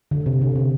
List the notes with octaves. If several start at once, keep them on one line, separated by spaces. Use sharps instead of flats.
D3
C3
D3
C3